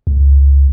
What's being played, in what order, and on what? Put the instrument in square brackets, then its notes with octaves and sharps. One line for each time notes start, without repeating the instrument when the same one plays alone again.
[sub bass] C#2